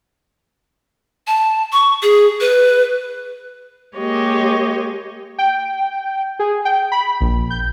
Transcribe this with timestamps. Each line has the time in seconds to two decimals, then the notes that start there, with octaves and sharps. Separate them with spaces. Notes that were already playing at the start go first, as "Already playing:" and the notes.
1.27 A5
1.73 C#6
2.03 G#4
2.41 B4
3.96 G#3 A#3 G4 C#5 D#5
5.38 G5
6.39 G#4
6.65 G5
6.92 B5
7.21 A#1
7.50 G6